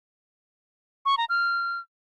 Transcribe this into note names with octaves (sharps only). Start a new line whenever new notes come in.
C#6
A#5
F6